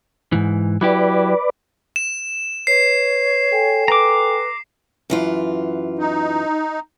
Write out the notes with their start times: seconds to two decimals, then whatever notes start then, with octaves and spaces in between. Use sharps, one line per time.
0.32 G#2 E3
0.81 F#3 E4 G4 B4 D5
1.96 E7
2.67 B4 C#5 C7
3.51 A4 G5 G#5
3.88 B4 A#5 D6
5.10 F#2 E3 F4
5.99 D#4